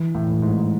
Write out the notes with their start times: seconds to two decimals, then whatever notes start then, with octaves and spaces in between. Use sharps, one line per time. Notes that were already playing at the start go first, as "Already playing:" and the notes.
Already playing: E3
0.15 A2
0.31 A2
0.42 G#2